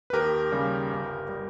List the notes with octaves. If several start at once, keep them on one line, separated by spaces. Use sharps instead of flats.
B4
D#2 G4 A#4
C#3 G3
G1
G3